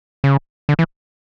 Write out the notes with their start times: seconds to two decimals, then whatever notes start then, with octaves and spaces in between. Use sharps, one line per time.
0.24 C#3
0.69 D3
0.79 E3